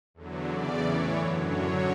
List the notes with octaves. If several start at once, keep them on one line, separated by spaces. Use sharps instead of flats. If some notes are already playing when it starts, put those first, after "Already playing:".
E2 D3 F#3
E2 C#3 E3 D5
A2 E3 C#5
F#2 D3 F#3
F#2 D3 F#3 C#5